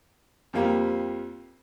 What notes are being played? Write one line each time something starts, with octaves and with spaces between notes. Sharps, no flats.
F2 F3 G3 A#3